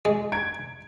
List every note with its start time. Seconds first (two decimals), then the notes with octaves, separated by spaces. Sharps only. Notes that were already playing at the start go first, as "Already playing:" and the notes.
0.05 G#3
0.32 G#6 D7